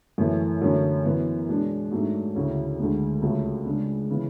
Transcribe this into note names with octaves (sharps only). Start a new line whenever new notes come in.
F#2 E3 A3
F#2 D3 F#3 A3 C#4
F#2 E3 B3
B2 G#3 D4
G#2 F#3 A3 D4
D2 C#3 F#3 C#4 E4
D2 D3 G#3
C#2 C#3 F#3 A3
C#3 G#3 D4
C#3 E3 B3